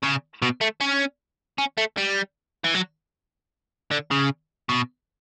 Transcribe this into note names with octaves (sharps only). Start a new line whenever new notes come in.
C#3
B2
A3
C#4
C#4
A3
G3
E3
F#3
D3
C#3
B2